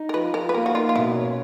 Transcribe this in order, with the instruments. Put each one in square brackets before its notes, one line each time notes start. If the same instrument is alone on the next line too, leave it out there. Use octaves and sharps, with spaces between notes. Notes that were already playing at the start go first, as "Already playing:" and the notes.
Already playing: [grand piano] D#4
[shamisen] A#4
[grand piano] F3 [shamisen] B4
[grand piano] F3 [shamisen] A#4
[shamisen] B4
[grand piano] A#3 [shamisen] A#4
[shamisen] F#4
[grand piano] D#4 [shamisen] F4
[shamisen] F4
[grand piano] B2 [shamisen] E4
[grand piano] C#4